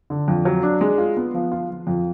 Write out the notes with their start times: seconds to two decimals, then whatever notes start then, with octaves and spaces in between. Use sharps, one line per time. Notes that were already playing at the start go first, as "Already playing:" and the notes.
0.10 D3
0.28 F2
0.45 F#3
0.63 D4
0.81 G#3
0.98 F4
1.17 B3
1.34 F3
1.52 F4
1.70 F3
1.87 F2